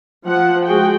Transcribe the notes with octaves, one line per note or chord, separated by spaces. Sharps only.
F3 F#5
G#3 F#4 G#4 G5